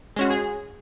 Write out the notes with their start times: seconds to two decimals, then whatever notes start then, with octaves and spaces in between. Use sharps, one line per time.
0.16 G#3 C#4 F#4
0.30 G#4